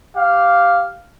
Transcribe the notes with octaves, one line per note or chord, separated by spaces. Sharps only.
G4 F5